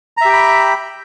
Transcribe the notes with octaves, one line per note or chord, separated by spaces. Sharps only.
G4 E5 G5 A#5 B5